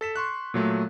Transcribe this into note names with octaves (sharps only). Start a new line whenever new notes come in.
A4 B6 E7
C6 C#6 F#6
A#2 F#3 A3